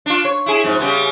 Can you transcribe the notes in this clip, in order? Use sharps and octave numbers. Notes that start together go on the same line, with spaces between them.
D4 F4
C#5
E4 G#4
F2 G#2
C#3 G3 B3